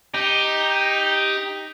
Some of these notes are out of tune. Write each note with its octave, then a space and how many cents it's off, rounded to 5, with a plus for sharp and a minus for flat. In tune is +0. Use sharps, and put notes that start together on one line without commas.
D#4 +0 G4 +10